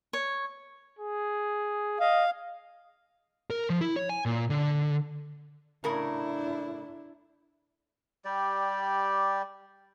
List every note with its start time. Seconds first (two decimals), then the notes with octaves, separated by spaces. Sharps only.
0.13 C#5
0.99 G#4
2.00 D#5 F5
3.50 A#4
3.70 F3
3.81 E4
3.96 C#5
4.09 G#5
4.26 A#2
4.50 D3
5.84 A2 C#3 D4 E4 A#4
8.25 G3 G4 D5